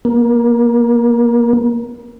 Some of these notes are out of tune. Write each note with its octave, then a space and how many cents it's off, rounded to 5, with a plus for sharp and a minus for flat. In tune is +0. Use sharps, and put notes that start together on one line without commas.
A#3 +25